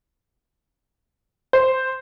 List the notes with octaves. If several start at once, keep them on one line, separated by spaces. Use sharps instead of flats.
C5